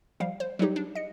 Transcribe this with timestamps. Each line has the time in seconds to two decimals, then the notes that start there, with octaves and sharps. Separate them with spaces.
0.20 F3 G3 F5
0.40 C5
0.59 F#3 G3 D#4 G4
0.76 D4
0.95 D#5 C#7